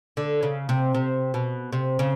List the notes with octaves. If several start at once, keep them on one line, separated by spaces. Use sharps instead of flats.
D3
C#3
C3
C3
B2
C3
C#3